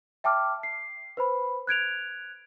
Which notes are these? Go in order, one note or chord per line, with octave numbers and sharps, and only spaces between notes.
E5 G5 A5 D6 F6
C7
B4 C5 B5
F#6 G#6 D7 F7